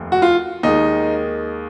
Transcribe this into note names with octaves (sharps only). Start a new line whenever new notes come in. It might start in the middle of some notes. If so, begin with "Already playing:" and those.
Already playing: F1 D#2
F#4
F4
D#2 D#3 G#3 D#4